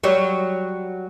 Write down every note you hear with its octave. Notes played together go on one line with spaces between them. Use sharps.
F#3 G3